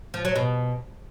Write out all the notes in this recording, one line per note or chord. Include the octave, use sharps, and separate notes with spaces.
F3
F#3
B2